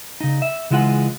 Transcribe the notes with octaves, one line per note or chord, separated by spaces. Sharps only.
C#3 D#4
E5
C#3 E3 G#3 F4 F#5